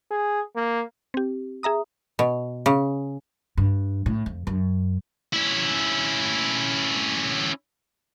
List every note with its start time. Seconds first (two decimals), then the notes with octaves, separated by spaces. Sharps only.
0.11 G#4
0.56 A#3
1.14 C4 G4
1.63 G#4 E5 A#5 D#6
2.19 B2
2.66 C#3
3.57 G2
4.06 A2
4.26 F2
4.47 F#2
5.33 C#4 E4